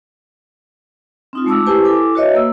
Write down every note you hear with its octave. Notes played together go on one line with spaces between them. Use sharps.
C4 D#4 F4
G#3 A3 A5 D6 E6
E4 G4 B4 C5 G#5 A5
E4 A4 G#5 D6
F#4 B4 C#5 D#5 E5
A#3 E6